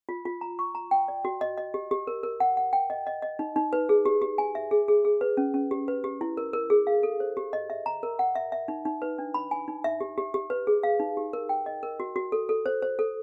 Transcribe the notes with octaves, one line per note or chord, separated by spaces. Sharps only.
F4
F4
A#5
C#6
A#5
G5
D5
F#4
D#5
D#5
G4
G4
A#4
A#4
F#5
F#5
G5
D#5
D#5
D#5
D#4
D#4
B4
G#4
G4
G4
G#5
E5
G#4
G#4
G#4
B4
C#4
C#4
G4
B4
G4
E4
A#4
A#4
G#4
F5
A4
C5
G4
D#5
E5
A#5
A#4
F#5
E5
E5
D#4
D#4
B4
D4
B5
G#5
D#4
E5
G4
G4
G4
B4
G#4
F5
D#4
G4
A#4
G5
D#5
A#4
F#4
F#4
A4
A4
C5
C5
A4